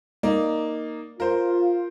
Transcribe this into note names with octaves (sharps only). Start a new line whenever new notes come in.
A#3 D#4 D5
F4 A#4 C5